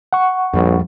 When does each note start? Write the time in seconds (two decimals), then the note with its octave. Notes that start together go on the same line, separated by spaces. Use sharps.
0.13 F#5 C#6
0.54 A#1 F2 F3 G3